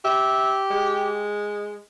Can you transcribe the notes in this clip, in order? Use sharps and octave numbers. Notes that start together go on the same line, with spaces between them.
G4 E5
G#3